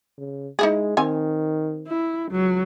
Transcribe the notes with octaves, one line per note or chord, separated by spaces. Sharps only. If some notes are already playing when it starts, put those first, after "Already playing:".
C#3
G#3 D#4 E4 G#4
D#3 C4 G#5
E4
C#2 F#3